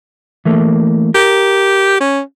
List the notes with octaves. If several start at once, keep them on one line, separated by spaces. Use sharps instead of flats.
E3 A3 A#3
G4 A#4
C#4